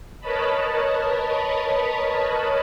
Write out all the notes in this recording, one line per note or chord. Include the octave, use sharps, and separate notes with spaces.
A#4 B4 C#5 D#5 A5 B5